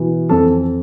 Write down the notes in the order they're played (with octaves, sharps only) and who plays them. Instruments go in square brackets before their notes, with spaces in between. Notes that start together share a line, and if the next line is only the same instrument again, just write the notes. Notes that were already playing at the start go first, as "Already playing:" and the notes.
Already playing: [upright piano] B2 E3
F2 A4